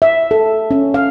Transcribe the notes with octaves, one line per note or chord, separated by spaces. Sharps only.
E5
A4
C#4
F5